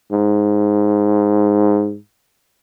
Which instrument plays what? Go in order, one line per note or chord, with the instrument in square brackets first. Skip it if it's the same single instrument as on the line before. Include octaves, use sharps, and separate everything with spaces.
[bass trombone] G#2